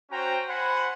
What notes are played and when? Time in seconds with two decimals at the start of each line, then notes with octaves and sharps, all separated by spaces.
0.11 C#4 F#4 C5 G5 A#5
0.49 C5 F#5 G#5 B5